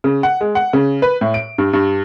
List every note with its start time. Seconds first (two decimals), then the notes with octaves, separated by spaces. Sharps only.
0.04 C#3
0.23 F#5
0.41 G#3
0.55 F#5
0.73 C#3
1.02 B4
1.21 A2
1.34 D7
1.58 G2
1.73 G2